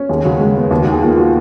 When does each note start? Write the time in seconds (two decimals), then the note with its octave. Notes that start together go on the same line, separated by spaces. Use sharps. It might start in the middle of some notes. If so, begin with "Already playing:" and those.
Already playing: C#4
0.09 D#2 G#4
0.25 C#3 F#4
0.40 G#3
0.56 B3
0.71 D#2
0.81 F#4
0.87 D#3 G#4
1.02 A#3 F4
1.17 F4 F#4